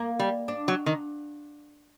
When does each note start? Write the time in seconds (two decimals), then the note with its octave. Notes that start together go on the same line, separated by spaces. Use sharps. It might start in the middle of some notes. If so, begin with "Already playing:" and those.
Already playing: A#3
0.19 G3
0.48 D4
0.68 F#3
0.86 D#3